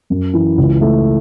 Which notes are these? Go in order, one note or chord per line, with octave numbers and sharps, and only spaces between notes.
F#2
E3
C#2
A3